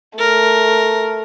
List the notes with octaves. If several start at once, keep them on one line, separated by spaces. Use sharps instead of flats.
A3 A#4